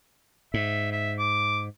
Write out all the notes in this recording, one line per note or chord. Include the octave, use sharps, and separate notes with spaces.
G#2 E5
E5
D6